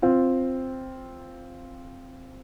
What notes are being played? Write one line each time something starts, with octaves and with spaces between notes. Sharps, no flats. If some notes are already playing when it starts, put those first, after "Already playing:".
C4 F4